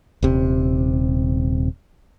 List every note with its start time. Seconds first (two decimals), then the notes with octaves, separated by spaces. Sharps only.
0.23 D#1 C3